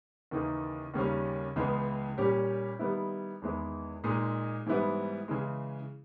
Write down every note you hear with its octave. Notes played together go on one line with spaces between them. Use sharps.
D#2 C#3 E3 A#3 D#4
D#2 C#3 G3 A#3 C#4
C#2 C#3 E3 G#3 B3
A#2 G3 C#4 G4
D#3 G3 B3 E4
E2 D#3 G#3 B3 E4
A#2 G#3 D#4
G#2 E3 G3 B3 E4
C#3 E3 G#3